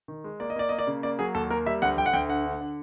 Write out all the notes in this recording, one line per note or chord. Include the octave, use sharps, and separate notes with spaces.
D#3
G#3
A#3 D5
D#5
A#3 D5
A#3 D#5
D5
C#3
A#3 D5
F#3 G#4
D#2 A4
A#3 A#4
G3 E5
D2 F#5
D2 G5
F#5
D2 G5
D3 F#5
D3
D3